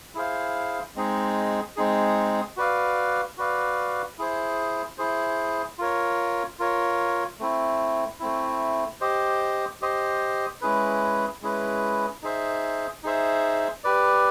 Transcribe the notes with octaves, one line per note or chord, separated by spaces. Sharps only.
E4 G#4 C5 F5
G#3 C4 D#4 G#4
G#3 C4 D#4 G#4
F#4 B4 D5 F5
F#4 B4 D5 F5
E4 G#4 C5
E4 G#4 C5
F4 A#4 C#5
F4 A#4 C#5
A3 C4 E4
A3 C4 E4
G4 C5 D#5
G4 C5 D#5
G#3 C#4 E4 G#4 B4
G#3 C#4 E4 G#4 B4
D#4 G#4 C5 E5
D#4 G#4 C5 E5
G4 B4 D5